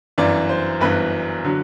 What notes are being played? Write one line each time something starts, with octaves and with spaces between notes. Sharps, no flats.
G1 F#2 E3 D5
C5
G1 F#2 E3 B4
D3 F#3